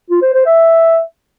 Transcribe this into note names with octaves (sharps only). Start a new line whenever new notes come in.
F4
C5
C5
E5